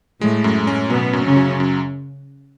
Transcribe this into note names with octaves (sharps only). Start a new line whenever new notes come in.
A2 G#3 A3
F#2
C#4
B2 F#3 B3
F#2
C#3 C#4
F#3
F#2